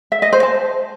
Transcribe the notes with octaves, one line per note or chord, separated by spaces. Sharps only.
E5
D#5
C5
A5